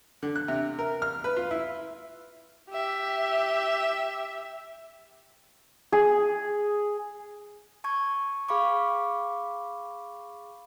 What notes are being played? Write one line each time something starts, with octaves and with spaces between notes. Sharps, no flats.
D3
F#6
C3
A#4
F6
B4
F4
E4
G4 E5
G#4
A5 C#6 G#6
G#4 F5 B5 C#6 D6